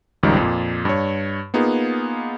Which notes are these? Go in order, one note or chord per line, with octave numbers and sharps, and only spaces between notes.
G#1 C#2 F#2 D#3 F3 G3
F2 A#2
G2 C#5
A#3 B3 D#4 F4 G#4